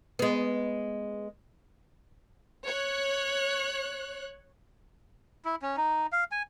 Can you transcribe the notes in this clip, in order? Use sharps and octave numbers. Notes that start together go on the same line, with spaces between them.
G#3 B3
C#5 F#6
E4
C#4
D#4
F5
G#5